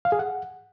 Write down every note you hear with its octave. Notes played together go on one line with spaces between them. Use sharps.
F5
G#4
F#5